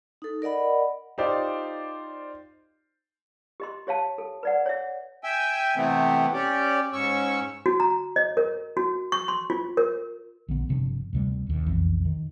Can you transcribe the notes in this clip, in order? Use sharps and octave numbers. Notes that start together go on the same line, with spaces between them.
D#4 A4
A#4 D5 D#5 F#5 B5
D#4 F4 G4 C5 D5
G4 D#5 C6
G4 C#5 F5 A5
A4
B4 D5 F#5
C#5 E5
E5 G5 G#5 E6
C3 E3 A3 B3 C4
C#4 G4 D5
G#2 C#4 C#6 E6
F#4
A#5
D#5
A#4
F#4
C#6
C6
F4
A#4
A#1 D3 B3
G1 C3 F3 D4
D2 C3 G3
D#1 D#2
E1 B1 F2 E3
D#3